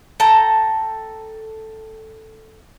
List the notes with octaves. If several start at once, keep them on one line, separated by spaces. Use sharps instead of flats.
A4 G5 A#5